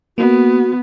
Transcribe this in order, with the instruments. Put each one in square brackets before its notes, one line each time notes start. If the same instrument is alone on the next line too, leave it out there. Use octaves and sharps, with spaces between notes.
[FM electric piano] A#3 [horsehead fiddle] B3 [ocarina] F#4